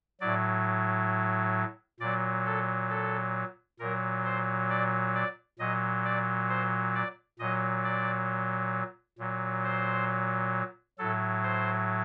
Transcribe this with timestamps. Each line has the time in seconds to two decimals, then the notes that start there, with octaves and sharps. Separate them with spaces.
0.20 A2 F#3 D5
2.00 A#2 F#3 D5
2.46 A4
2.90 A4
3.80 A#2 F#3 A#4
4.25 C5
4.70 D5
5.15 D5
5.59 A#2 F#3 D#5
6.05 D5
6.49 C5
6.95 D5
7.39 A#2 F#3 D#5
7.84 D5
9.19 A#2 F#3
9.64 C5
10.99 A2 F#3 A4
11.44 C5